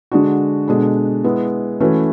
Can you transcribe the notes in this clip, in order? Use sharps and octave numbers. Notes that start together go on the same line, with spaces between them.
D3 G#3 D4 F#4
B2 G#3 D4 A4
G#3 B3 E4
E3 A3 C#4 F#4 B4